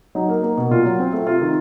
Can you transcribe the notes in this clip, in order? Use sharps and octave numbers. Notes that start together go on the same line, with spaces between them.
F#3 D#4
A#3
A#3
B2
A#2 F4
F#3
C4
A3
C3 F4
D#3